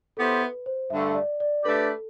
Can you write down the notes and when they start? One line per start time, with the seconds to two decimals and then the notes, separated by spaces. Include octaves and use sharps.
0.17 B3 E4 G4 A4 C5
0.41 B4
0.66 C5
0.90 G2 D3 A3 E5
1.15 D5
1.40 D5
1.64 A3 D4 G4 A4 B4 D5